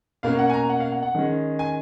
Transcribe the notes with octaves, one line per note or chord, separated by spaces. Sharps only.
B2 A#3 C#4 F5
F#5
G#5
A#5
F#5
F5
F#5
F#5
D#3 G#3 C#4
G#5